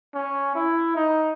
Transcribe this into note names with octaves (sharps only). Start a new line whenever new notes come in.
C#4
E4
D#4